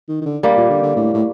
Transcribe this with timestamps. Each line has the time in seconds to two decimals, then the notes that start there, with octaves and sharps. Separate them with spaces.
0.09 D#3
0.22 D#3
0.26 D3
0.43 G3 A#3
0.57 A#2
0.70 D3
0.83 D3
0.96 A2
1.14 A2